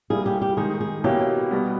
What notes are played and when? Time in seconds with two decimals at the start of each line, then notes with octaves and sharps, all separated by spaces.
0.10 G3 A#3 E4 G#4
0.26 G4
0.42 G4
0.57 D#3 G#3 D#4 G#4
0.80 G#4
1.04 B2 A#3 C#4 E4 G4
1.51 B2 G3 B3